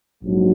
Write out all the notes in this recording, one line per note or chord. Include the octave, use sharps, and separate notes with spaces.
A#1 G#2 F#3